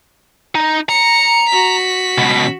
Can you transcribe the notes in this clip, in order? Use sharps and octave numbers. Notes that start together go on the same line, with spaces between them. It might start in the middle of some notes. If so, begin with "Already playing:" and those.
D#4
A#5 C#7
F#4 B6
C#2 B2